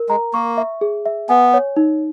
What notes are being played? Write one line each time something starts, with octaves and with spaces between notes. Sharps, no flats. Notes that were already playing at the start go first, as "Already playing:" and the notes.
Already playing: A#4
G#3 A#5
A#3 C#6
E5
G#4
E5
B3 G#5
C#5
D#4